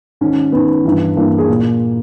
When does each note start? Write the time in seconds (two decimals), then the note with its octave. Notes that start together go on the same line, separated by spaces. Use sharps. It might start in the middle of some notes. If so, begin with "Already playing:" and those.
0.21 G#2 D#3 C#4
0.52 G#2 D#3 B3
0.85 G2 E3
1.17 G2 E3 A#3
1.38 G#4
1.49 A#2